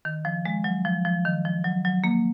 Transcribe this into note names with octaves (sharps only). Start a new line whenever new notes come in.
D#3
F3
G#3
F#3
F3
F3
D#3
F3
F#3
F#3
A#3